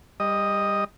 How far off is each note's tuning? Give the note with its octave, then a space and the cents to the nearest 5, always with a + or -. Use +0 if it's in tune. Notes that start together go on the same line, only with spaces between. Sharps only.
G3 +20 D#5 +0